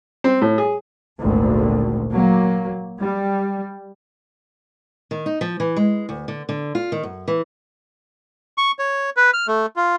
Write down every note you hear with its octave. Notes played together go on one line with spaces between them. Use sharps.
C4
A2
G#4
G#1 D2 A#2
F#3 A#3
G3
D#3
D#4
F3
E3
G#3
D2
D3
D3
F4
D#3
F#2
E3
C#6
C#5
B4
F6
A3
F4